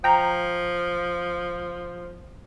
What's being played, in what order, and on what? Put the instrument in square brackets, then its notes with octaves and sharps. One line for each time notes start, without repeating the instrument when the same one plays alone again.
[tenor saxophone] F3 [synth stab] G5 A#5